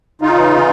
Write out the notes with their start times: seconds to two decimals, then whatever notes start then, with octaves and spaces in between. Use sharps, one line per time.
0.22 C#3 D#4 F4
0.36 E3